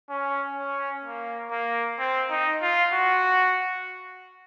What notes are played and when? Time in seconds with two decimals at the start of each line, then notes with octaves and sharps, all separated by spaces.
0.09 C#4
0.57 C#4
1.05 A#3
1.51 A#3
1.99 C4
2.30 D#4
2.62 F4
2.93 F#4